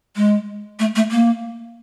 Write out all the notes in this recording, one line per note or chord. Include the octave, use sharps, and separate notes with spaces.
G#3
A3
A3
A#3